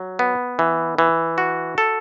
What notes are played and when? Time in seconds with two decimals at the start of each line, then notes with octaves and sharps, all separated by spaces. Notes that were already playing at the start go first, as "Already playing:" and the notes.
Already playing: F#3
0.19 B3
0.59 E3
0.98 E3
1.38 F#4
1.78 A4